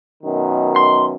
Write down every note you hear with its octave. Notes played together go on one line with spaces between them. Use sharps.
F#2 B2 D#3
C6